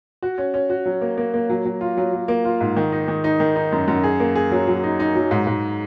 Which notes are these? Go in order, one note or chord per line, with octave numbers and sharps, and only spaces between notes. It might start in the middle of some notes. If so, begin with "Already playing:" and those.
F#4
C#4
C#4
F#4
F#3
A#3
A#3
A#3
F#3
F#3
F4
F#3
F#3
A#3
F4
G#2
D#3
D#4
D#3
D#4
D#3
D#4
F#2
F#2
G#4
A#3
G#4
F#3
F#3
D#4
D#4
F#3
G#2
G#2